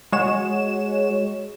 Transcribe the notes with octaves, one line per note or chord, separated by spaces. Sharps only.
G#3 F#4 C#5 E7